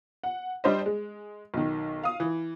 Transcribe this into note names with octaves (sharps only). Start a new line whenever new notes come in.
F#5
G3 D4 C5 D#5
G#3
B1 D#3
F5 D#6
E3